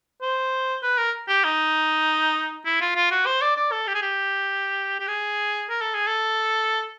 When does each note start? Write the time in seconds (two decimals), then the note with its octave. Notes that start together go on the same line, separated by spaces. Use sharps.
0.22 C5
0.83 B4
0.98 A#4
1.28 G4
1.44 D#4
2.66 E4
2.81 F4
2.96 F4
3.11 F#4
3.26 C5
3.42 D5
3.57 D5
3.72 A4
3.87 G4
3.95 G#4
4.02 G4
5.00 G4
5.08 G#4
5.69 A#4
5.81 A4
5.95 G#4
6.07 A4